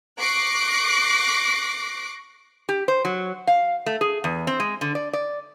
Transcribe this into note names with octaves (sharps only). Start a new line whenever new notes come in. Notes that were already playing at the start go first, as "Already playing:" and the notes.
C#6 D6 F#6 A#6 C7 D7
G4
C5
F#3
F5
A3
G#4
E2
C4
G#3
D3
D5
D5